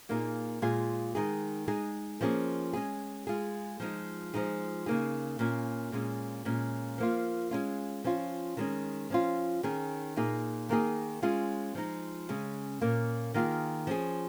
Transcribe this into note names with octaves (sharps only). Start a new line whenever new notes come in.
A#2 A#3 D#4 G#4
A#2 G#3 F4 G#4
D#3 G#3 D#4 G#4
G#3 D#4 G#4
F3 A#3 C#4 G#4
G#3 C#4 G#4
G#3 F4 G#4
F3 G#3 D#4
F3 G#3 D#4 G#4
C#3 A#3 D#4 G#4
A#2 A#3 C#4
A#2 G#3 C#4 G#4
A#2 G#3 C#4
F3 A#3 F4
G#3 C#4 F4
F3 C#4 F4
D#3 G#3 C#4
F3 C#4 F4
D#3 C#4 G#4
A#2 A#3 D#4 G#4
D#3 A#3 D#4 G#4
G#3 C#4 F4 G#4
F3 G#3 D#4
C#3 G#3 C#4
A#2 A#3 C#4
D#3 A#3 F4 G#4
F3 C#4 G#4